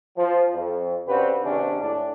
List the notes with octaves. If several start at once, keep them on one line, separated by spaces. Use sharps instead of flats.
F3
F2
C#3 C4 D4 F#4 G4 B4
D#2 G#2 C3 C#4 D4
A2 D4